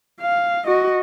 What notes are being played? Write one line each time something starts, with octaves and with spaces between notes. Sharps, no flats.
F5
F#4 D#5